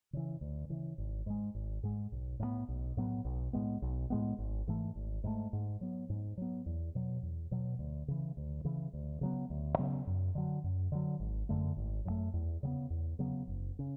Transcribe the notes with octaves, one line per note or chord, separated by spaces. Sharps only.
C#3 E3
D2
C#3 E3
G#1
G#2 G#3
G#1
G#2 G#3
B1
A2 F#3 B3
B1
A2 F#3 B3
B1
A2 G#3 B3
B1
A2 G#3 B3
G#1
G#2 E3 A3
G#1
G#2 E3 A3
G#2
F#3 B3
G#2
F#3 B3
E2
B2 F#3
E2
B2 F#3
D2
C#3 E3
D2
C#3 E3
D2
C#3 F#3 B3
D2
C#3 F#3 B3
F#2
D3 F#3
F#2
D3 F#3
G#1
F#2 D3 A3
G#1
F#2 D3 A3
E2
C#3 F#3 B3
E2
C#3 F#3 B3
F#1
C#3